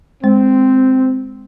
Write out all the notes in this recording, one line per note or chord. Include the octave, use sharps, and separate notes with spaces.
G#3 C4